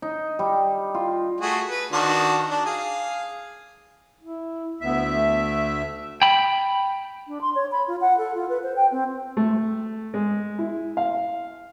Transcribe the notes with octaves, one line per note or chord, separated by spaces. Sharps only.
D#4
G3
F4
A3 F#4 G#4
B4
D#3 D4 F#4
D4
G#4 F5
E4
D2 B3 E5
A3
G5 B5
D4
C6
C#5
B5
F4
F#5
A4
F4
B4
C5
G5
C4
A3
G#3
E4
F5